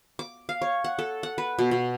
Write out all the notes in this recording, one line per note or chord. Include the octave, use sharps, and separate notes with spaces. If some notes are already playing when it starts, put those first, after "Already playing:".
D6
F5
C#5
F#5
A4
F#5
B4
B2
B2